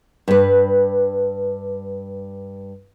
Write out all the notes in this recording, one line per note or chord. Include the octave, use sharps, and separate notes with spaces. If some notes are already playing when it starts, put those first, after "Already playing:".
G2 B4